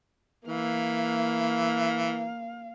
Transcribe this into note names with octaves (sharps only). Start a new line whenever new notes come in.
E3 A#3 F5